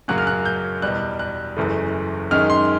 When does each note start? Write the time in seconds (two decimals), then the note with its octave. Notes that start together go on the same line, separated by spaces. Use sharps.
0.08 F#2 C#3 F#3 A#3 C#4 F#6
0.18 F6
0.27 F#6
0.45 G6
0.82 E2 B2 G3 F#6
1.19 F#6
1.57 F#1 F#2 C#3 E3 A3
2.31 F#2 D#3 G#3 C#4 F6
2.50 C6